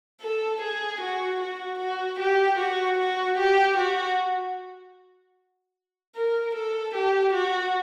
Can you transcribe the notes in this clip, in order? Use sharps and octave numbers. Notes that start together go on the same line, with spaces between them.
A4
G#4
F#4
F#4
F#4
G4
F#4
F#4
G4
F#4
A#4
A4
G4
F#4